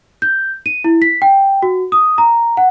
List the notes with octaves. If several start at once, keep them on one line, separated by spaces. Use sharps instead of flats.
G6
D#7
E4
B6
G5
F#4
D#6
A#5
F#5